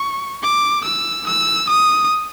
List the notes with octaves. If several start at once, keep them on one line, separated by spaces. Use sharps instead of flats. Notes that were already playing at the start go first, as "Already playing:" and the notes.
Already playing: C#6
D6
E6
E6
D#6